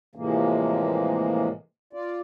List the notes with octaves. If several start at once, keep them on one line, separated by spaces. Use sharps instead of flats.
A2 C3 E3 F3 G#3 A#3
F4 D5